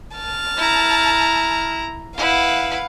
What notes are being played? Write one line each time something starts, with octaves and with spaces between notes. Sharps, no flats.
A5 F6
E4 A#5
E4 B4 F5 F#5